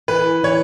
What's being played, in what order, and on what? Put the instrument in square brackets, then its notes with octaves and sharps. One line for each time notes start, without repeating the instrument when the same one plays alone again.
[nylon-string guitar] E3 [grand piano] B4
[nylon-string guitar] E3 [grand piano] C#5